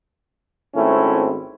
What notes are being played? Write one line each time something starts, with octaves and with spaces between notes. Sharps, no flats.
G#1 A3 C4 C#4 E4